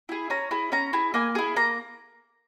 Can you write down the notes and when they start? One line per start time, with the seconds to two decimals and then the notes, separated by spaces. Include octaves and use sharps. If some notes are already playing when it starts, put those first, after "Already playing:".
0.09 E4 G#4
0.30 C#4 A#5
0.51 E4 G#4
0.72 C#4 A#5
0.93 E4 G#4
1.14 A#3 G#5
1.35 E4 G#4
1.56 A#3 A#5